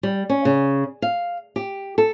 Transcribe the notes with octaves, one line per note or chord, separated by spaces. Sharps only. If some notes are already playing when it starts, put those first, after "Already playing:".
G3
C#4
C#3
F5
G4
A4